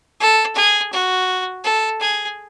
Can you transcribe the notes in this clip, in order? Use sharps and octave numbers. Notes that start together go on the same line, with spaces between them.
A4
G#4
F#4
A4
G#4